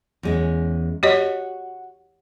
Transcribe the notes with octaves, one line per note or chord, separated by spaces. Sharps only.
E2 G#3 C#4
F#4 G4 C#5 D#5